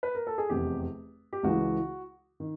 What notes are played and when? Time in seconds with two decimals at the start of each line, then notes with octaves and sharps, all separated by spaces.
0.03 B4
0.15 A#4
0.27 A4
0.38 G#4
0.49 F1 E2 C3 G4
1.33 G4
1.43 C#2 C#3 E3 G#3 F#4
2.40 D#3